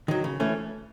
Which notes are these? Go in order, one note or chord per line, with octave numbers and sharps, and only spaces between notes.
D#3 F#3
C#3
E3 A3 C#4